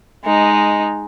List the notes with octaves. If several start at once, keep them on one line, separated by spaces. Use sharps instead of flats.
G#3 D#4